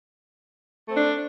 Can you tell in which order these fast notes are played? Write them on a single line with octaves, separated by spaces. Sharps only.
A3 C4 D4